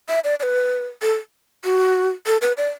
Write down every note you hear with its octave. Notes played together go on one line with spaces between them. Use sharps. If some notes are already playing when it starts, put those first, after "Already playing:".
E5
D5
D5
B4
A4
F#4
A4
B4
D5